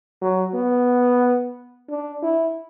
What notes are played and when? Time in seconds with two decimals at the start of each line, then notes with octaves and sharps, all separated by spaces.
0.22 F#3
0.54 B3
1.90 D4
2.23 E4